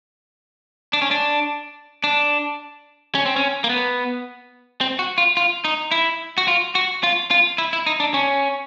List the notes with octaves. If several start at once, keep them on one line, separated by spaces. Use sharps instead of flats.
D4
C#4
D4
D4
C#4
C4
C#4
A#3
B3
C4
F#4
F4
F4
D#4
E4
F#4
F4
F#4
F4
F4
E4
E4
D#4
D4
C#4